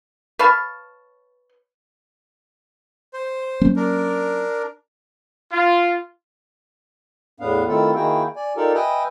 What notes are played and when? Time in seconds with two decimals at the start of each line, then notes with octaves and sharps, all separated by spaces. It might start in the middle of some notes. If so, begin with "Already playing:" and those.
0.39 B4 C#5 F5 A5
3.14 C5
3.61 F#3 A#3 C#4
3.76 D4 A#4
5.52 F4
7.40 E2 A2 B3 D4 F5
7.68 D#3 A3 C4 E4 F4 A4
7.95 D#3 A#3 E4 F#4 G#4 G5
8.36 D5 G#5
8.57 D#4 F4 G4 A4 A#4 D5
8.75 B4 D#5 E5 G5 G#5